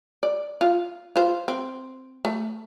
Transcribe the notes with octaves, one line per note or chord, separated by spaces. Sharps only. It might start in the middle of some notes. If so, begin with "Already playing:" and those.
D5
F4
F4 C5
C4
A3